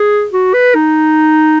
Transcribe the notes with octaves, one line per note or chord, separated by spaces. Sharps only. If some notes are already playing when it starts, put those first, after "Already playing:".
Already playing: G#4
F#4
B4
D#4